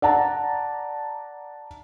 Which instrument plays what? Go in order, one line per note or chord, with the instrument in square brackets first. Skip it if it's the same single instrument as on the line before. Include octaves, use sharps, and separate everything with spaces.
[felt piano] D5 F#5 A5 A#5